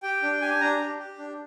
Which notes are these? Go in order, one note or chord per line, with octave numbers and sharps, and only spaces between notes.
G4 G5
D4
G4 G#5
D4 A#5
G4
G4
D4